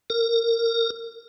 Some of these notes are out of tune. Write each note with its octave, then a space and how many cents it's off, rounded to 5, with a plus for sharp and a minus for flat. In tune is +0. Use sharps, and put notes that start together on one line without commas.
A#4 -20